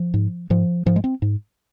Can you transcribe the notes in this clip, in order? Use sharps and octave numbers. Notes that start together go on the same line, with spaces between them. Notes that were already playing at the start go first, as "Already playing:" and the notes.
Already playing: F3
G#2
G#2 F3
G#2 F3
G#3
C4
G#2